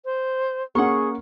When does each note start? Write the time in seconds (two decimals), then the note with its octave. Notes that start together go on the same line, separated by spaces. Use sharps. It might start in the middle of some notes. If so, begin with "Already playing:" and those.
0.05 C5
0.75 A#3 C#4 G#4 F#5 C6 C#6